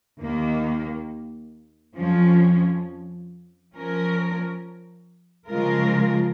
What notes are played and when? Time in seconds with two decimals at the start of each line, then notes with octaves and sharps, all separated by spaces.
0.21 D#2 D#3 A#3
1.97 F2 F3 C#4
3.73 F3 C#4 A#4
5.49 C#3 F3 G#3 F4 A#4